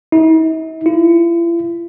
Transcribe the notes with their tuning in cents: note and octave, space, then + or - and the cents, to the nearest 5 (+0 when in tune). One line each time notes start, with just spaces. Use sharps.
E4 -45
E4 +45